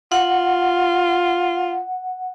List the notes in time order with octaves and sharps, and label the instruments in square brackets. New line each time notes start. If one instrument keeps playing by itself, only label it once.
[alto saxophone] F4 [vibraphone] F#5